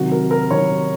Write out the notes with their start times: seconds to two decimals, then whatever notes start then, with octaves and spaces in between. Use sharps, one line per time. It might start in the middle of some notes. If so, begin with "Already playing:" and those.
Already playing: C3 D#3 F#3 F#4
0.11 A#4
0.31 A#4
0.50 C3 D#3 F#3 C#5